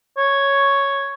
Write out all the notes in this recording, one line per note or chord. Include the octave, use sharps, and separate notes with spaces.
C#5